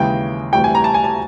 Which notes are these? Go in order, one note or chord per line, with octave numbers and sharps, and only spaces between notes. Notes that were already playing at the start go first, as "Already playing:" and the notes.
Already playing: D#2 C#3 E3 G#3 G5
D2 C3 E3 G3 G5
G#5
A#5
A5
G#5
A5